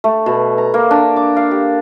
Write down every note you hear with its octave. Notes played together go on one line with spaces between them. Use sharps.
A3
B2
A#5
A#3
D4
D6
F5
G4